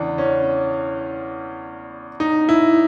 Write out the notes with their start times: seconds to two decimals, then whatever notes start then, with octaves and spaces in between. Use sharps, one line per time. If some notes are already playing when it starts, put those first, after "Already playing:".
Already playing: E2 C#3 E3 D4
0.18 C#4
2.20 D#4
2.49 E4